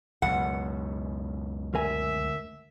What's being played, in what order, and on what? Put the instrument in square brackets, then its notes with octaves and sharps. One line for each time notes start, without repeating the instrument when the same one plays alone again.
[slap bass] C#2 F#2 B2 [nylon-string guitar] F#5
[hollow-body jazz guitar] D2 A#4 G#5 [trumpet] E5